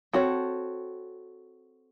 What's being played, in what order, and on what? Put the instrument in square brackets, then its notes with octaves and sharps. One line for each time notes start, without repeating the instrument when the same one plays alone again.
[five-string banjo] C4 F#4 A4 C#5